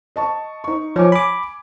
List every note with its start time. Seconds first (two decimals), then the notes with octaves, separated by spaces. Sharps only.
0.16 D#5 A5 C#6
0.64 D#4 C#6
0.96 F3 C#5 G#5 D6
1.12 G#5 B5 D6